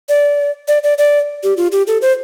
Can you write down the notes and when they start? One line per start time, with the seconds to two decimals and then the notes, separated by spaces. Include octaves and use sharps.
0.09 D5
0.68 D5
0.83 D5
0.98 D5
1.43 G4
1.57 F4
1.72 G4
1.87 A4
2.02 C5